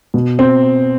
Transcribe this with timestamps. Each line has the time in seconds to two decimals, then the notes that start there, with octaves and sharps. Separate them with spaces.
0.14 B2
0.39 C4